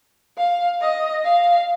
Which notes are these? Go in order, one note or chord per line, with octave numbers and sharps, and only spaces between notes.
F5
D#5
F5